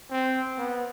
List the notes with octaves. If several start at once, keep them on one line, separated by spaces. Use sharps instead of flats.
C4
B3